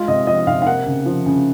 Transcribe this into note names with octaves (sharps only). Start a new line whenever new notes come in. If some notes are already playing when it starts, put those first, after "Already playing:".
Already playing: G#3 F4
C3 D#5
F3 D#5
C3 F5
F5
A#3 F#5
C#3
F3
C#3